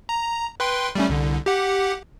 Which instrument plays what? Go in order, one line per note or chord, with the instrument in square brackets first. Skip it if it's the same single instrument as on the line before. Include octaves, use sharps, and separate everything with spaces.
[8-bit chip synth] A#5
B4 G5 C6
G3 A3 C#4
C2 D3
G4 F#5